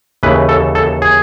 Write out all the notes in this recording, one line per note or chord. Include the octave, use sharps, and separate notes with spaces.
D#2 C#3 E3 B4
A4
A4
G#4